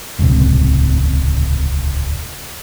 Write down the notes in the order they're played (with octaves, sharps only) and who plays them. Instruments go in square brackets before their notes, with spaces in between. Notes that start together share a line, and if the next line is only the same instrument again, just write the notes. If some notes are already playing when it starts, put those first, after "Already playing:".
[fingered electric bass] D#1 C#2 A2 C3